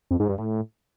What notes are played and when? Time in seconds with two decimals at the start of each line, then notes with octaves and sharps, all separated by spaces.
0.11 F2
0.20 G#2
0.29 G2
0.38 A2